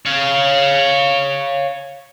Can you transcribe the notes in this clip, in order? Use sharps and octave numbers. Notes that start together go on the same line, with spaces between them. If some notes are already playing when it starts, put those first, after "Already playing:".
C#5 F5